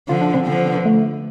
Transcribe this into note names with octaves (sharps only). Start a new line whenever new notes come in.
D3 F3 F4
D4
C4
D3 F3 C4
B3
A3